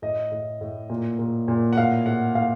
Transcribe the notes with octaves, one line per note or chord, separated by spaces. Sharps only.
A2 D#5
A2
A2
A#2
A#2
A#2
F#5
A2 F5
A2 F#5
A2 F5